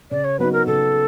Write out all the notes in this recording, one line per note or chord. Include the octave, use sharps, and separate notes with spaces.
C#3 D5
C#5
F#3 B3 D#4 F#4 B4
A#4
C#3 A4